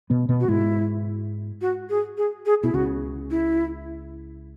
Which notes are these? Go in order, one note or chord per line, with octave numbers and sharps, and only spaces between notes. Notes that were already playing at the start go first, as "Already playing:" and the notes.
B2 B3
B2 B3
F#4
G#2 G#3 E4
F#4
G#4
G#4
G#4
B2 E4
C#2 C#3 F#4
E4